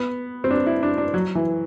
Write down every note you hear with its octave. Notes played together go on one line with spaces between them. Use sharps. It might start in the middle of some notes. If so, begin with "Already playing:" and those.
Already playing: B3
C4
D4
E4
D4
D4
F#3
E3